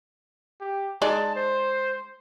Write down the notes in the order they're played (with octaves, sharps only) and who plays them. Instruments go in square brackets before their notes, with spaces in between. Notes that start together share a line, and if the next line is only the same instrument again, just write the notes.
[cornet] G4
[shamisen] G#3 D#4 D5 [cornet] A5
[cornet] C5